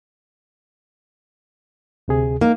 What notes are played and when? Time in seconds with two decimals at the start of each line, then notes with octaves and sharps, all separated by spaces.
2.08 D2 C3 G#4
2.41 A#3 D#4